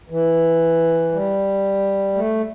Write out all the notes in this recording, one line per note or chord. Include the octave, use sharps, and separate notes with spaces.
E3
G3
A3